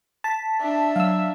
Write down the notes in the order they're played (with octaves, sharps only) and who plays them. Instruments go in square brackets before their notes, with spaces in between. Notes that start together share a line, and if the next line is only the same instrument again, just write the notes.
[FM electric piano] A5 [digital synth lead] B6
[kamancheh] D4 E5
[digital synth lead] F#3 [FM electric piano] F5 E6